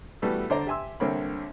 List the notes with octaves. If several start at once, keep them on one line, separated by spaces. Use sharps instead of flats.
E3 G3 A3 B3 F#4 A4
D3 C5 D5 A#5
G4 E5 G#5 C6 E6
C2 D3 A#3 C4 C#5 B5